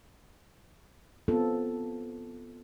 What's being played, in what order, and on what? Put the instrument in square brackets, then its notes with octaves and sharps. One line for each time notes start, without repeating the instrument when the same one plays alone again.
[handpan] B3 C4 F4 A4